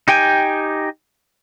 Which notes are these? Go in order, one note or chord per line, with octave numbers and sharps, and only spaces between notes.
D#4 G4 G5 G#5